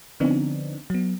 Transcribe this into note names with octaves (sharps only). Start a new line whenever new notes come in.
D3 F3 B3 C4 D4 D#4
F#3 B3